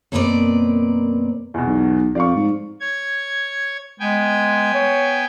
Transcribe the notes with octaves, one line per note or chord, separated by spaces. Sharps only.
F#2 B2 A#3 C4 B4 D5
E2 B2
B1
F2 D5 F5 C#6
G#2
C#5 G#6
G#3 B3 G5 G#5
C#5